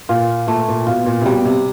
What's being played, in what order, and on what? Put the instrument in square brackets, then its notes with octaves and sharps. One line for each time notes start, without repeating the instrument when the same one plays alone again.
[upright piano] A#2 [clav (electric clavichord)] F4
[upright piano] A#2 [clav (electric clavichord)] A3
[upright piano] A#2
[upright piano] B2 [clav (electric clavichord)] F4
[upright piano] A#2
C3
[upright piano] B2 [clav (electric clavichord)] G3
[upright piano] C3